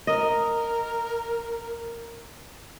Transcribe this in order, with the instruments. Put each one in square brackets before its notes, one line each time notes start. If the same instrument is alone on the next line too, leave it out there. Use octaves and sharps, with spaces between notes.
[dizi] A#4 [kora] D#5